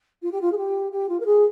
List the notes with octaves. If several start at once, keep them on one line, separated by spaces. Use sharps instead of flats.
F4
G4
F4
G#4
G4
G4
F4
A#4
G#4